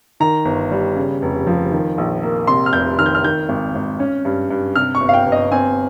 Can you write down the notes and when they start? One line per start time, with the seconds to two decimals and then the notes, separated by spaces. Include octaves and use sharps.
0.20 D#3 A#5
0.45 G1
0.71 G3
0.96 C#3
1.22 F1
1.47 F3
1.72 D#3
1.98 A#1
2.23 A#3
2.47 C3 C6
2.66 F6
2.73 F1 G6
2.99 D#3 F6
3.06 G6
3.15 F6
3.24 D#3 G6
3.49 G#1
3.75 G#1
4.00 C#4
4.25 G2
4.50 G2
4.76 C3 F6
4.95 C#6
5.01 G1
5.09 F5
5.14 G5
5.26 G1
5.32 D#5
5.52 C4 G#5